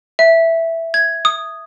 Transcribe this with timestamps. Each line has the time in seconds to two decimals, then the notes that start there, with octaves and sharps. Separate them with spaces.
0.19 E5
0.94 G#6
1.25 D#6